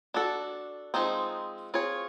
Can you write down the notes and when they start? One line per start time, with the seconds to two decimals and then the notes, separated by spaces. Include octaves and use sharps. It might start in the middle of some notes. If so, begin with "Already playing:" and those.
0.14 D4 F#4 A4
0.94 F3 G#3 C4 D#4
1.74 C4 F4 G#4 C#5